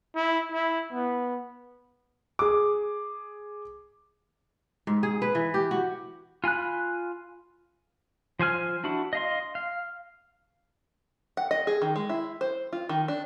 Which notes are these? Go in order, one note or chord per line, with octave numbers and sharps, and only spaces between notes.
E4
E4
B3
G#4 D6
G#2
G#4
B4
E3
G4
F#4
F4 G#5 B5 F#6
F3 C5 G#5 F6
D4 E4 F#4
D#5 F5 C6
F5
F#5
D#5
G#4
D#3
G#3
E4
C5
F4
D#3
D4